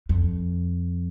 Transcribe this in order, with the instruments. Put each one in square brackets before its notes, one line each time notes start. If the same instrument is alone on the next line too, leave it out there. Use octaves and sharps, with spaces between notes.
[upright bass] F2